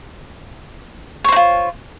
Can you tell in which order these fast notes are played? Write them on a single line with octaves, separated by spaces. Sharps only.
C#5 C5 D#4 F4